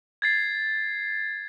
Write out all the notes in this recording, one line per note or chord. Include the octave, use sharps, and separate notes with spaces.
G#6 A6 C7